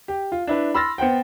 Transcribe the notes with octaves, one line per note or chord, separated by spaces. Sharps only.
G4
F4
D4 E4 B4
B5 C6 E6 F6 A6 A#6
B3 C5 F#5 G5